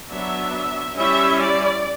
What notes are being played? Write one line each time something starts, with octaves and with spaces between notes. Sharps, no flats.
F#3 B3 D4 E5
G3 C#4 E4 E5
D5